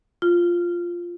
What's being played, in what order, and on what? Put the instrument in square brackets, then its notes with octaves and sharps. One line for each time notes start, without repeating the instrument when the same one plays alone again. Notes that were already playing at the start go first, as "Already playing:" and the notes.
[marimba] F4